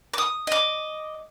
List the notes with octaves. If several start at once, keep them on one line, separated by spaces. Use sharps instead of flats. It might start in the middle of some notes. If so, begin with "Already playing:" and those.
D6 D#6
D#5 D6